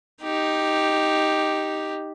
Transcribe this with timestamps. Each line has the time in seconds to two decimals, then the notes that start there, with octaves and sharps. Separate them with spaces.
0.23 D#4 G4